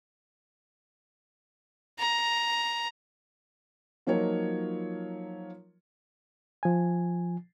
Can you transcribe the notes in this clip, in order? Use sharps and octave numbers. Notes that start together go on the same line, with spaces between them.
A#5
F3 F#3 A#3 D#4 F4 C#5
F3 G#5